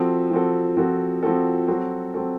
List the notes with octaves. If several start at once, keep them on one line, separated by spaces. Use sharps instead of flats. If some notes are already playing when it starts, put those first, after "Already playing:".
Already playing: F3 C4 F#4 A4
F3 C4 F#4 A4
F3 C4 F#4 A4
F3 C4 F#4 A4
F#3 C4 F#4 A4
F#3 C4 F#4 A4